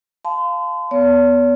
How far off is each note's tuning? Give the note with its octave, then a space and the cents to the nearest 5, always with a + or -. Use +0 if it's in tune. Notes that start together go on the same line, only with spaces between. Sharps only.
F5 +0 A5 -15 C6 -35
B3 +0 C#5 +45